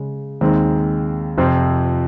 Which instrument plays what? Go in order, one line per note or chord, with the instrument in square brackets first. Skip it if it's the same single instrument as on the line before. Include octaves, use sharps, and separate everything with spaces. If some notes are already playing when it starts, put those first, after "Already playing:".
Already playing: [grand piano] C#3 G#3
D#2 D#3 G#3 C4
F2 C3 F3 C4 F4